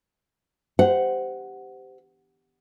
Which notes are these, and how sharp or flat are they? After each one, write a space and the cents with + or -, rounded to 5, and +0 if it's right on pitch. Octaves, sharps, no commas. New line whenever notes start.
G4 +0 C5 -20 F#5 +0